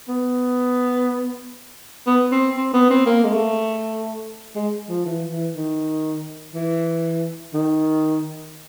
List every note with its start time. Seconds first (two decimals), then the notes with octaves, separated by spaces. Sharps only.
0.08 B3
2.07 B3
2.32 C4
2.57 C4
2.73 B3
2.90 C4
3.06 A#3
3.24 G#3
3.32 A3
4.55 G#3
4.89 F3
5.05 E3
5.30 E3
5.55 D#3
6.55 E3
7.54 D#3